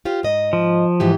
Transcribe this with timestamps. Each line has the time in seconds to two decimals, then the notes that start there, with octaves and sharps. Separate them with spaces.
0.05 F4 G4 C5
0.23 G#2 D#5
0.53 F3
1.00 G#2 E3 G4